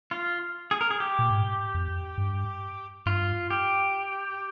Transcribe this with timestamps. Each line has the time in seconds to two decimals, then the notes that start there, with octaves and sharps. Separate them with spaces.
0.11 F4
0.71 G#4
0.81 A#4
0.91 G#4
1.00 G4
1.19 A#2
1.30 G#2
1.74 F2
2.18 G2
3.06 G2 F4
3.50 G4